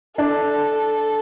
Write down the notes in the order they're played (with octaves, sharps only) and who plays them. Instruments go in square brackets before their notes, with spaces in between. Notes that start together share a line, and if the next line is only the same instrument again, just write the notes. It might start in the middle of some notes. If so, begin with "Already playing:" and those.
[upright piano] D4 [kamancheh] A4